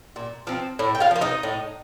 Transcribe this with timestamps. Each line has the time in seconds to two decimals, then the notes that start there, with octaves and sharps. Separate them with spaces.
0.16 A#2
0.47 F3 C4
0.79 A2
0.95 G5
1.00 F4 F5
1.11 F3 A#3
1.21 D#4 D#5
1.43 A2